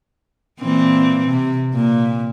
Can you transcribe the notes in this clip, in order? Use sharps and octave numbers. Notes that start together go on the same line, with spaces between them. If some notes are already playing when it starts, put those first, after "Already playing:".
A#2 E3 C4
C3
A#2